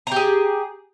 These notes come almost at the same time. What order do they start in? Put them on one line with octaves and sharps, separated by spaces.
A#5 G4 G#4